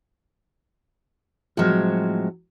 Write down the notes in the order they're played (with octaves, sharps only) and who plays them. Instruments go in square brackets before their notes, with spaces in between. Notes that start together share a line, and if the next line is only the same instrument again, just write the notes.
[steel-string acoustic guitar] A2 F#3 [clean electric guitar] F3 G#3 C4